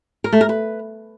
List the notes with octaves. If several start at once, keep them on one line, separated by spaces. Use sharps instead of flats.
A#4
A3
A#4
B4